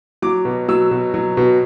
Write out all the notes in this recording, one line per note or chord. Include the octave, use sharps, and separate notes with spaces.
F#3 D6
B2
F#3 E6
B2
F#3
B2